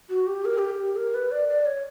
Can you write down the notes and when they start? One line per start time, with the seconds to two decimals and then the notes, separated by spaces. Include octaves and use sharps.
0.10 F#4
0.27 G4
0.45 A#4
0.58 G4
0.83 G4
0.96 A#4
1.14 B4
1.32 D5
1.48 D5
1.66 C#5